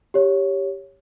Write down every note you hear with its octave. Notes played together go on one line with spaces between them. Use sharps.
G4 C#5